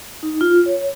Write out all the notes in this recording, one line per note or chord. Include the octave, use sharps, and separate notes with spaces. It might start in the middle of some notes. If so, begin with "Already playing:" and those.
D#4
F4
C#5